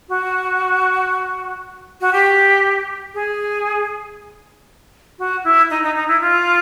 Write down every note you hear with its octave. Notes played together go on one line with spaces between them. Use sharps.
F#4
F#4
G4
G#4
F#4
E4
D#4
D#4
D#4
E4
F4